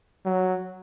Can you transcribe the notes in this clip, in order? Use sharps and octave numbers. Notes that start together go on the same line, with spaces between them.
F#3